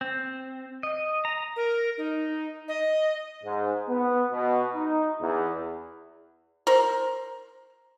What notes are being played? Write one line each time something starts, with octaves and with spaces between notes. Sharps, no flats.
C4
D#5
A#5
A#4
D#4
D#5
G#2
B3
B2
D#4
E2
A#4 C5